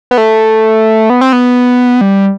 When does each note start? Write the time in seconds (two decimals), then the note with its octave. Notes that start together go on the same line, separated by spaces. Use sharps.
0.11 B3
0.18 A3
1.10 B3
1.21 C4
1.33 B3
2.01 G3